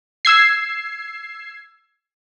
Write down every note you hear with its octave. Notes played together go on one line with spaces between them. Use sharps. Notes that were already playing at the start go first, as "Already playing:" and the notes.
E6 G#6 C7